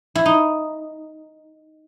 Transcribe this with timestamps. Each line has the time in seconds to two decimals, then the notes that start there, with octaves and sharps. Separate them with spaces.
0.15 E4
0.26 D#4